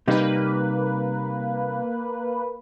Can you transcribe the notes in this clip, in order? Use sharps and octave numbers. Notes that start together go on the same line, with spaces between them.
C3 G3 A#3 D#4 B4